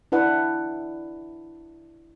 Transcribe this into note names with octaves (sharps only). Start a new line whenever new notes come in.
D4 E4 B4 F#5